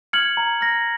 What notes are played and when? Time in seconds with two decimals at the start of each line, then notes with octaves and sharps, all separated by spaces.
0.13 F6 G#6 C#7 F#7
0.37 A#5
0.61 F6 A#6